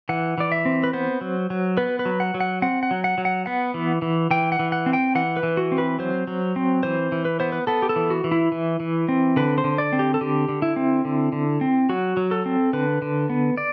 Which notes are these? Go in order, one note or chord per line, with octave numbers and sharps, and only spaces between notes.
E3 F#5
E3 D5
E5
C4
B4
B3 C5
F#3
F#3
B3 B4
B4
F#3
F#5
F#3
F#5
C4 F#5
F#5
F#3
F#5
F#3
F#5
B3 F#5
E3
E3
E3 G5
F#5
E3
F#5
C4
G5
E3 F#5
B4
E3
F#4
C4
B4
F#3 C5
F#3
C4
E3 C5
E3
B4
B3 C5
B4
B3 A4
G4
A4
E3
F#4
E3
E4
E3
E3
C4
D3 B4
C5
D3
D5
C4
G4
A4
D3 G4
D3
E4
C4
D3
D3
C4
F#3 F#4
F#3
A4
C4
D3 B4
D3
B3
D5